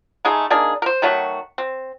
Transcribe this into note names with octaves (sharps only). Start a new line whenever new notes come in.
G#3 A3 D#4 G#4
A#3 D4 D#4 G#4
A#4 C5
D#3 F#3 A3 F#4
C4